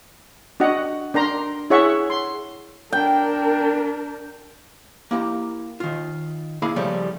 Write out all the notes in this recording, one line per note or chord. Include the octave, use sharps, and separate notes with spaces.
D4 F#4 D#5 F#5
D4 A#4 A#5 C6
E4 G#4 C#5 E5 F#5 C#6
C6
D4 A#4 G5
A#3 E4 G4 A#5
D#3 F4
A#3 E4 G#4 F5 A#5 B5
C#3 F3 G3 A3 C#4